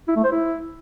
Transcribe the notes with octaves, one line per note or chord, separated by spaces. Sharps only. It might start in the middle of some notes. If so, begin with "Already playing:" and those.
E4
A3
C5
E4